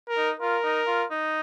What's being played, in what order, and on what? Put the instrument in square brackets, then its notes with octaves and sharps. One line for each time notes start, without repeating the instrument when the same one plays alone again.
[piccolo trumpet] A#4
[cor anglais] D#4
[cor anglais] F4 [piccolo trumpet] A#4
[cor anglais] D#4
F4
D#4